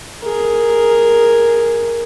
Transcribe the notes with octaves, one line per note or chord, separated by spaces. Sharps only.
G#4 A#4